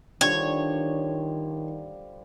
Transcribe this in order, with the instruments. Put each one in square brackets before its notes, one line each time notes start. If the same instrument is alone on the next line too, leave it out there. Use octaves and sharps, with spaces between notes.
[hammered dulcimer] D3 F3 G3 [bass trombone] D#3 [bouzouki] C#5